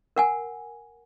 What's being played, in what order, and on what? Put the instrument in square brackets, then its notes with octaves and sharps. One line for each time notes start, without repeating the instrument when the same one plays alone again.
[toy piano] A#4 F#5 G#5